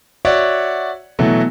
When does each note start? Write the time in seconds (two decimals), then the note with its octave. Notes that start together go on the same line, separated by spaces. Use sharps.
0.25 F#4 C#5 D5 E5 F#5
1.19 B2 E3 F#3 A3